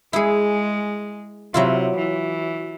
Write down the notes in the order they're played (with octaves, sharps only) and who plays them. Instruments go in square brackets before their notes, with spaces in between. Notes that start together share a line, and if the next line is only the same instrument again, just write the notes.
[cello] G#3 [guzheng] E4 G#4
[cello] C3 [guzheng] F#3 E4 F4
[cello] E3